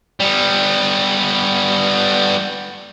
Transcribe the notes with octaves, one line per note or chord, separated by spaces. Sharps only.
G3 B3